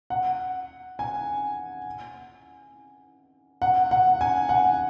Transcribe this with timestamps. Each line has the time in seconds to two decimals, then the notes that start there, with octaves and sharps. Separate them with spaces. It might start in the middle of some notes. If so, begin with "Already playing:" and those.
0.10 F#5
0.99 G#5
3.62 F#5
3.91 F#5
4.21 G#5
4.49 F#5